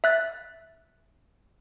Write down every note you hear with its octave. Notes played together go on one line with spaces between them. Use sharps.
E5 F#6 A6